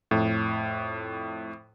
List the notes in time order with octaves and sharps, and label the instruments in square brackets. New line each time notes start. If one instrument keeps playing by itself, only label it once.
[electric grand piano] F2 A2